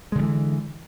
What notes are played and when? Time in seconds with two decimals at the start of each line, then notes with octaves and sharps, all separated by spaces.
0.12 G#3
0.15 D3
0.19 G3
0.22 E3